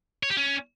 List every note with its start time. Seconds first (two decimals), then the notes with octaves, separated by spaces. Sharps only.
0.23 C#5
0.30 G4
0.37 C#4